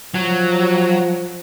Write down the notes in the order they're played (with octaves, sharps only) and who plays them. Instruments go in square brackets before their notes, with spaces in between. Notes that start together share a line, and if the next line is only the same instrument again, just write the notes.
[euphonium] F3 [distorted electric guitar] F#3